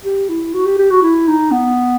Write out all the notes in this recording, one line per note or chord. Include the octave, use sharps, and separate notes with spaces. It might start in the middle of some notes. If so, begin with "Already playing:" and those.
G4
E4
F#4
G4
G4
F#4
E4
D#4
B3